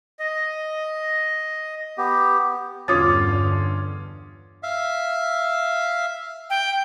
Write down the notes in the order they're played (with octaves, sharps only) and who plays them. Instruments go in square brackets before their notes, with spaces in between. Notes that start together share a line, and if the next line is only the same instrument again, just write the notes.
[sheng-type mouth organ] D#5
[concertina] B3 G4
[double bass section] E2 G2 D3 [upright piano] C#4 F4 [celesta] D6 D#6 A6
[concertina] E5 F5
[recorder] G5